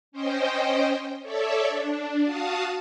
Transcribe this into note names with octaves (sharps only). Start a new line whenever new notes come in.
C#4 C5 D#5 G5
A4 C#5 D5 E5
D4
F#4 F5 A5 D#6